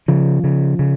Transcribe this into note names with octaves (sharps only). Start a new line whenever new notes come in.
C#3 F3
C#3
C#3